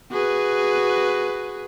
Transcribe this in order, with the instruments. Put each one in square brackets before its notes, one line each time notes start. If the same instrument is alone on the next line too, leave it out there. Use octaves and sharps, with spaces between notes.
[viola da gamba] F#4 G#4 B4